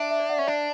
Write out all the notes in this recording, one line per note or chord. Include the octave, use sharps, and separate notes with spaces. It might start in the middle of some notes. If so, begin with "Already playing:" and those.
Already playing: D4 E5
E5
D5
F#5
C#4 E5
D4 D5